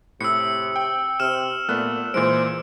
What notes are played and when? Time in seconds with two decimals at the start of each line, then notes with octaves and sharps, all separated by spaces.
0.21 A2 C3 E6 C#7
0.76 G5
1.20 C3 E6 F6 E7
1.69 A#2 A3 B3 F#6
2.14 A#2 E3 G#3 C5 D7